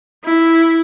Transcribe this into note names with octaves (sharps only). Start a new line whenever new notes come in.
E4